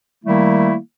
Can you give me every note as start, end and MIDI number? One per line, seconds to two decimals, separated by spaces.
0.24 0.76 51
0.24 0.76 55
0.24 0.76 57
0.24 0.76 58
0.24 0.76 64